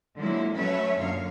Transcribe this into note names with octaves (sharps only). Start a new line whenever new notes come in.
D3 F3 F#3 G#3 A#3 E4
F#3 A3 C#4 B4 C#5 E5
F#2 A#2 D3 F#3 C#5 F5